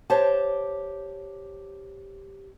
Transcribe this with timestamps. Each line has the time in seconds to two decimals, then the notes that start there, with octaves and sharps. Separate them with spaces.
0.10 G4 C5 C#5 A5